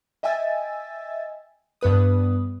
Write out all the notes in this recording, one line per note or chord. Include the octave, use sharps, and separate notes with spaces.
D#5 E5 G5 G#5 E6 A6
G2 B3 B4 D#6